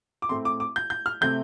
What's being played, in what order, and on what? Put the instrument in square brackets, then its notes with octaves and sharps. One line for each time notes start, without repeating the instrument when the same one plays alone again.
[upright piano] D6
A2 A3 C4 C6
D6
D6
G6
G6
F6
C3 A3 C4 G6